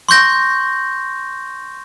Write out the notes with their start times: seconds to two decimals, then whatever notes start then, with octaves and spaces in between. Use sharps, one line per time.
0.09 C6 C#6 G6 A#6